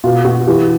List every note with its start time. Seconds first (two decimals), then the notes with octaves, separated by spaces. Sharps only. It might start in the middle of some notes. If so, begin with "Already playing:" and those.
0.04 B2 F4
0.25 B2 F#4
0.47 E3 G4